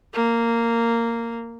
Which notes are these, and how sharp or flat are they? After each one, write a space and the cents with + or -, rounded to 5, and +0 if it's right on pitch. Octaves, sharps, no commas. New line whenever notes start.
A#3 -10